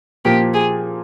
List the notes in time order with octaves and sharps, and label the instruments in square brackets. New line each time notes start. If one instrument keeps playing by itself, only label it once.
[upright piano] A#2 F3 A#3 [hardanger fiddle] G4
[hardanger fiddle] G#4